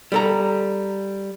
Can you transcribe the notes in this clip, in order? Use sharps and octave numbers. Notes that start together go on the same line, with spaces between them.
G3 A4 A#5